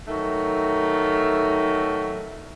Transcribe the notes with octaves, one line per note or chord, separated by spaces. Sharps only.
D#3 F#3 A3